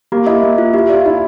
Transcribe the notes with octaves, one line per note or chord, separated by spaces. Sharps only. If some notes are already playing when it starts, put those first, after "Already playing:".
A#3 G4
E4 D#5
A#3
F4
E4 G4
F4 D5
D#4 E4